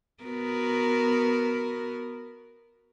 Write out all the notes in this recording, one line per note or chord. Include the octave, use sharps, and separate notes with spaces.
B3 F#4 A#4